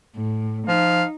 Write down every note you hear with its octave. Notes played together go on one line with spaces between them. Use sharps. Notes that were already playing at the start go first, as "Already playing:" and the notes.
A2
F3 D#4 F5